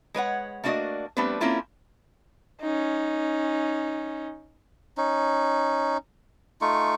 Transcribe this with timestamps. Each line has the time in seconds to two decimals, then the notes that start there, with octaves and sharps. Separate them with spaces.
0.14 G#3 B4 C#5 F#5
0.64 A3 A#3 D4 F#4 D5 D#5
1.17 G3 A3 B3 C4 D4 B4
1.40 A#3 C4 C#4 E4 F4 A4
2.61 C#4 D#4
4.97 C#4 D#4
6.61 A3 D#4 F4 C#6